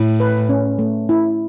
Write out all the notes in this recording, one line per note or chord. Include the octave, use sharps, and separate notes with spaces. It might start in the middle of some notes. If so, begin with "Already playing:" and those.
Already playing: A2 E4
B4
C#4
A3
E4